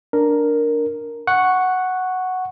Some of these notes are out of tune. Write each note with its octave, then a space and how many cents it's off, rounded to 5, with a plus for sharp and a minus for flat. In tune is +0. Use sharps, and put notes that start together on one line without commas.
D4 +0 A#4 +0
F#5 +0 C#6 +0